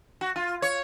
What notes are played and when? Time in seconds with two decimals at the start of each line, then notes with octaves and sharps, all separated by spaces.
0.21 F#4
0.36 F4
0.62 C#5